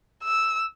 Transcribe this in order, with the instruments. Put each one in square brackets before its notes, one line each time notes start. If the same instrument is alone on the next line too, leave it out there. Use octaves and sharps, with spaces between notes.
[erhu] E6